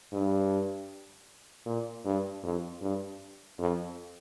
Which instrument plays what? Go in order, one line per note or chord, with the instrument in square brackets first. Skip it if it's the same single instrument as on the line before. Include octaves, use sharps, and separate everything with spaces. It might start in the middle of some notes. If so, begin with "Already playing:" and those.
[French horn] G2
A#2
G2
F2
G2
F2